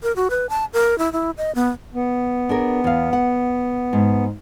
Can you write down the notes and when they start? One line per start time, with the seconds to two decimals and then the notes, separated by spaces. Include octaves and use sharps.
0.03 A#4
0.16 F#4
0.30 B4
0.50 A5
0.73 A#4
0.99 E4
1.13 E4
1.38 D#5
1.55 B3
1.94 B3
2.49 D4 G#4 A#4
2.84 E2 F5
3.13 F#5
3.93 G#2